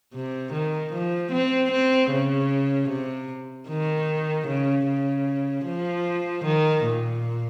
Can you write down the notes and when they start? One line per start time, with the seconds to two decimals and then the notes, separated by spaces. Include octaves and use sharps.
0.14 C3
0.53 D#3
0.93 F3
1.32 C4
1.71 C4
2.11 C#3
2.89 C3
3.69 D#3
4.47 C#3
4.87 C#3
5.66 F3
6.45 D#3
6.85 A#2